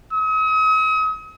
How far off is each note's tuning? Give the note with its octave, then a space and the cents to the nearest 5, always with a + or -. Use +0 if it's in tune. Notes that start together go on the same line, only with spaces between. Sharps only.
D#6 +40